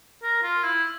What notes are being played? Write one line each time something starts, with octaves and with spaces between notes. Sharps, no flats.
A#4
F4
E4